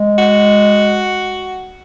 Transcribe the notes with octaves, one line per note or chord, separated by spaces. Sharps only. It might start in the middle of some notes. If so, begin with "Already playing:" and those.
Already playing: G#3
F#4